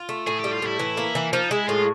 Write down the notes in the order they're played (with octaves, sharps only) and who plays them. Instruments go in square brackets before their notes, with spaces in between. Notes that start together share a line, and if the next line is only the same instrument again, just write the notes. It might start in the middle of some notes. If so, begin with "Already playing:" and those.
Already playing: [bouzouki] F4
A3
[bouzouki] A2 [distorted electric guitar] G#4
[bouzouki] G3 [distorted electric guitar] G4
[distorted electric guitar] F4
[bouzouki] A2 [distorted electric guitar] E4
[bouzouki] E3
A#3
E3
[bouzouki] F3 [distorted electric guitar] D#4
[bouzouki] G#3 [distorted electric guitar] E4
[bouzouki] A2 [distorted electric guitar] F4